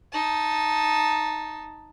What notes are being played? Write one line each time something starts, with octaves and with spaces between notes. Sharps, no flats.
D#4 A5